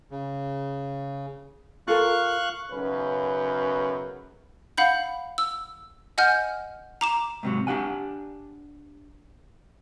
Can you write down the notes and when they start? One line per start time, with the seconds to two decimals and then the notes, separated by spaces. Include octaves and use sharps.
0.11 C#3
1.88 F4 A4 A#4 F5 C#6 F#6
2.71 B1 F#2 C#3 C#4 B4
4.78 F5 F#5 B5 G6
5.38 E6
6.18 D#5 F#5 G#5 F6 G6
7.01 A#5 D6 E7
7.43 G#2 C3 F#3
7.67 D4 G4 F#5 G#5